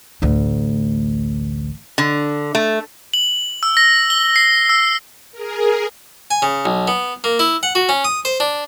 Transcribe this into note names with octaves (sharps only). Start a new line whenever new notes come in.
A1 D2
D3
A3
F#7
E6
A#6
G7
C7
E6
G#4 A#4
G#5
C#3
B1
B3
A#3
E4
F#5
F#4
C#4
D#6
C5
D4